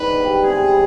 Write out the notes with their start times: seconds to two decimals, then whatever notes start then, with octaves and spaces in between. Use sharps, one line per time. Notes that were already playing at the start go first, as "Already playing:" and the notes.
Already playing: G#2 D#3 D4 B4
0.16 G3 B3
0.43 C3 G#4
0.71 G3 B3